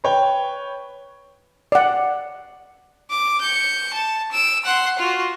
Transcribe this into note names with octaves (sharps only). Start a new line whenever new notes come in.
B4 C#5 G5
D5 F#5
D6
G6 C#7
A5
E6 D7
F#5 C6
F4 F#4